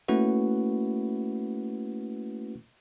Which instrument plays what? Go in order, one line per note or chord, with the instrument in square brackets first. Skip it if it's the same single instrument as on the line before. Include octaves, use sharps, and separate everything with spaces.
[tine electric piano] A3 A#3 C#4 E4 F#4 B4